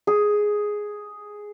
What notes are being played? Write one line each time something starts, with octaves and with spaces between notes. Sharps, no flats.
G#4